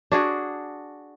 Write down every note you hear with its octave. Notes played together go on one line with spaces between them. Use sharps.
D4 F#4 G#4